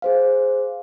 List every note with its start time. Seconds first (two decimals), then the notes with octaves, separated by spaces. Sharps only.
0.02 G#4 C5 F5